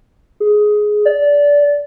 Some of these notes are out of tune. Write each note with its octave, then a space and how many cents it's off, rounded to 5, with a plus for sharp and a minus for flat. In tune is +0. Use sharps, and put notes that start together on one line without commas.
G#4 +10
D5 -20